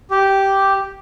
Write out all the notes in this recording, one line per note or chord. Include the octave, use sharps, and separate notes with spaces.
G4